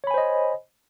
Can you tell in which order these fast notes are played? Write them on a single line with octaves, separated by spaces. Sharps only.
C#5 B5 G#5 C5 D#5